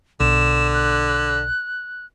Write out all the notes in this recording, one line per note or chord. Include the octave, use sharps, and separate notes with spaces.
B1 D3 E7
F#6